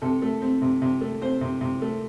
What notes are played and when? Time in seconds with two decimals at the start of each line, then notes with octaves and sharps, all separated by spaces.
0.02 C3 A4
0.22 A3
0.42 C4
0.62 C3
0.82 C3
1.01 A3
1.21 C4 C5
1.41 C3
1.61 C3
1.82 A3